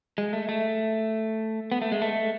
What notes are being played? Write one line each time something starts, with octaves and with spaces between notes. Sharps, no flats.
G#3
A3
A3
B3
A3
G#3
A3